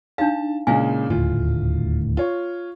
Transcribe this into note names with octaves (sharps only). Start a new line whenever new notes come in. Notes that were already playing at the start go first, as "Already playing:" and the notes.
D4 D#4 F5 A5
A#2 C#3 G#3 E4 F5 G#5
D#1 D2 A2 F4
F4 C#5